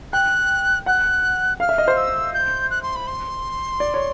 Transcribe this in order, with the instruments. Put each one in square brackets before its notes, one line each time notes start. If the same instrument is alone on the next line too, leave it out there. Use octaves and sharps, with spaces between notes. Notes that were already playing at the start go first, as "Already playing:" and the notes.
[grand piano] G5 [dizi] F#6
[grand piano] F#5 [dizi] F#6
[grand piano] F5 [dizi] F6
[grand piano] E5
D#5
C5
[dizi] E6
G6
F#6
C6
B5
C6
[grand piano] D5
C#5